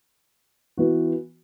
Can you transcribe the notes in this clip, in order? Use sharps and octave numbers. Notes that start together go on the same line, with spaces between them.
E3 B3 F#4